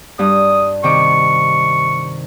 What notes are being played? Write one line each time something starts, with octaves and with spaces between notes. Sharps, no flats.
G2 D#6
C3 D#3 C#6 D6